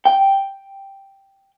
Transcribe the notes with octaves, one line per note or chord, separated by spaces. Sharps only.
G5